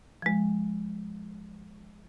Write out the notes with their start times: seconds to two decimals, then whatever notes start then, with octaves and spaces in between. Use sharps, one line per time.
0.22 F3 G#3